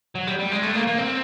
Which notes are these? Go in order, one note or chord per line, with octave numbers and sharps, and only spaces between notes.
F#3
G3
G3
G#3
A3
A#3
A#3
C4